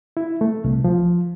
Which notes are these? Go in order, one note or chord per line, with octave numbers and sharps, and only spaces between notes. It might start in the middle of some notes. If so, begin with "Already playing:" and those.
E4
A3
C2
F3